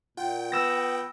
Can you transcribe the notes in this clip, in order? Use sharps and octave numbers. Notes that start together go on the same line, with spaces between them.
A#2 F4 F#5 G5
B3 E6 A#6